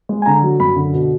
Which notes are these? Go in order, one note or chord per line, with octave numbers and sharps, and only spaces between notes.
G#3
G#5
D3 A#5
F#3
F#2 B5
D3
B2